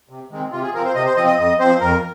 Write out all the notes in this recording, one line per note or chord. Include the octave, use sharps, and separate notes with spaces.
C3
D#3 G#3 C4
C3 F4
G#4
F3 C4 A#4
C5
C3 D#5
C5
F3 C4 D#5
D#5
F2 D#5
F3 C4 C5
F2 A#4